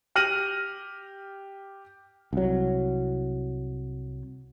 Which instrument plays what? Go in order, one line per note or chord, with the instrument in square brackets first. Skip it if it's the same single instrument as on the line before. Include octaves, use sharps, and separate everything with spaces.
[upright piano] G4 F6 A#6 D#7 F#7
[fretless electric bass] C2 F#3